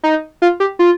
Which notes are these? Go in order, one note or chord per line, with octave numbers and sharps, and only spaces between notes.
D#4
F4
G4
F4